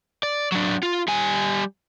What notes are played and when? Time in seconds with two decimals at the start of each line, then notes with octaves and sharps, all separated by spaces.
0.23 D5
0.52 F#3 D4
0.83 F4
1.08 G3 G#5